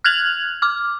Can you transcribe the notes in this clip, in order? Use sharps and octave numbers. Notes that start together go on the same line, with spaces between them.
F6 F#6 G#6 F7 F#7
D6 F6